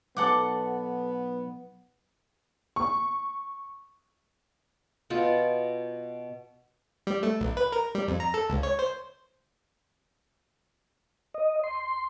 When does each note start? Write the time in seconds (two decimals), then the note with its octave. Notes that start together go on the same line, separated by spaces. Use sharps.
0.17 B1 B3 A4 F#5 D6
2.76 C#6
5.10 B2 B3 F4
7.07 G3
7.23 A3
7.40 B1
7.57 B4
7.72 A#4
7.95 G3
8.08 F2
8.20 A#5
8.34 A4
8.50 C#2
8.63 C#5
8.79 C5
11.34 D#5
11.64 C6